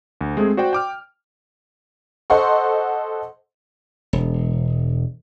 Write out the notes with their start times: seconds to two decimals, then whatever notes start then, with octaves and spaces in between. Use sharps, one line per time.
0.21 D2
0.37 G#3 A3 C4 G#4
0.57 F#4 C5 D5 G5
0.73 G5 D6 F6
2.30 A4 C5 D#5 F#5 C6 C#6
4.13 E1